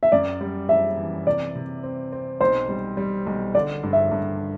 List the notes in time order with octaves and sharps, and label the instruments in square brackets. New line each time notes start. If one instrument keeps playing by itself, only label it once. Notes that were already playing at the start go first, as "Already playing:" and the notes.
[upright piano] E5
[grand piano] F#2 [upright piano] D5
[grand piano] G3
[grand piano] G3 [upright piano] E5
[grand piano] E3
[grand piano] C3 [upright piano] D5
[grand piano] C3
C4
C4
[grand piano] B1 [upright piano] C5
[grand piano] G3
G3
B1
[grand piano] D3 [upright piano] D5
[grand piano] G2
[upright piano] E5
[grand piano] G2